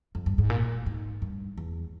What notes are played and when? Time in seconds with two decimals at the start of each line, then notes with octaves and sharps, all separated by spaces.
0.15 F2
0.26 G2
0.38 G#2
0.50 A#2
0.86 G#2
1.22 G2
1.58 E2